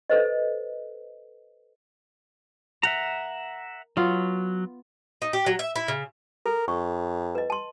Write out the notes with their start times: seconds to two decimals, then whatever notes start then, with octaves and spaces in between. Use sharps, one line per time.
0.10 A4 B4 C5 D#5
2.83 A#4 E5 F#5 A#5
3.97 F#3 B3 F4
5.22 D#4
5.33 G4
5.46 F#3
5.59 E5
5.76 E4
5.88 C#3
6.46 A4 A#4
6.68 F2 C#6
7.35 B4 D#5
7.50 A5 C6